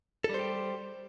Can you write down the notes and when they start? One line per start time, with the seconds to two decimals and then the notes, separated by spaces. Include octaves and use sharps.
0.24 A4
0.29 G3
0.34 C5
0.39 G4